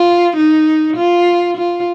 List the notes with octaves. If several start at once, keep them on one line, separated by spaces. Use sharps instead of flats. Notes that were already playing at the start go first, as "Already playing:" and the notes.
Already playing: F4
D#4
F4
F4